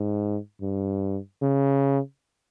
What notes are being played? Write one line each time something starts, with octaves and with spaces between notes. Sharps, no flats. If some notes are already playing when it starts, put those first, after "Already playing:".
Already playing: G#2
G2
C#3